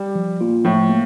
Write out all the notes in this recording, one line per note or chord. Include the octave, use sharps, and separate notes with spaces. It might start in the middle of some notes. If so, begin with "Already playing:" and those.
Already playing: G3
F3
A#3 F4
A2 F3
A#3